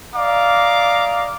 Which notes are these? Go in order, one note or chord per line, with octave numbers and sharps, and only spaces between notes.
D5 D#5 F5 A#5 D6